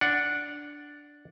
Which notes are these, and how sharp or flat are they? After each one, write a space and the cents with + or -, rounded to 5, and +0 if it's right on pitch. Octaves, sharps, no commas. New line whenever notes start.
D4 +0 C#5 +45 F#5 +0